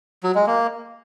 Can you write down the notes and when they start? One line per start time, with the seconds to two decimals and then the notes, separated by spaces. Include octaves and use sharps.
0.23 F#3
0.35 G#3
0.47 A#3